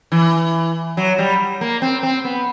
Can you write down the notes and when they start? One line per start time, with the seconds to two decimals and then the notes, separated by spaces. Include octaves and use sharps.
0.12 E3
0.97 F#3
1.18 G3
1.61 A#3
1.82 C4
2.03 C4
2.25 B3